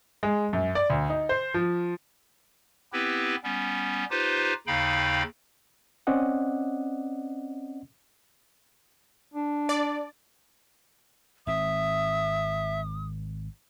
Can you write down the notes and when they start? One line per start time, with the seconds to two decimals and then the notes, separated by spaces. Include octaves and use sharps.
0.23 G#3
0.53 F#2
0.75 D5
0.90 D2
1.10 D#4
1.29 C5
1.54 F3
2.93 B3 C4 E4 G4 B4
3.44 G3 B3 C#4
4.10 D#4 F4 G4 B4 C5
4.67 D#2 C#3 D#4 F5 G5 B5
6.07 C4 C#4 D5 D#5 F#5
9.34 D4
9.69 D5
11.47 G#1 C4 E5 D#6